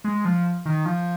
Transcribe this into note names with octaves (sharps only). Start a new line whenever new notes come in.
G#3
F3
D#3
F3